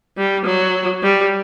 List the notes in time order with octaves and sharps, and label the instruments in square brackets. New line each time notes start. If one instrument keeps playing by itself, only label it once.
[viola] G3
F#3
G3